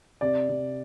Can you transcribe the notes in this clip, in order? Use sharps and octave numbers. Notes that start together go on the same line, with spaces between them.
C3 D5
C3